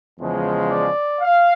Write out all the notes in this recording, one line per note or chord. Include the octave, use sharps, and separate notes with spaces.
E2 C#3 F3 G#3
D5
F5